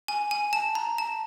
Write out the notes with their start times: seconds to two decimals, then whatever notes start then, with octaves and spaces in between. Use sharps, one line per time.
0.08 G#5
0.31 G#5
0.53 A5
0.75 A#5
0.98 A5